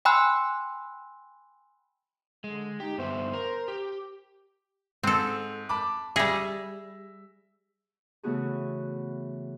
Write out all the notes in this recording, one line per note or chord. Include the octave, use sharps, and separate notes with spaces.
G5 G#5 B5 C6 E6 F#6
D3 G#3
D#4 G4
G2 B3 C5 E5
A#4
G4
G#2 C4 A4
A5 B5 D6
G3 G#4 E5 A#6
C#3 E3 A3 B3 F#4 G#4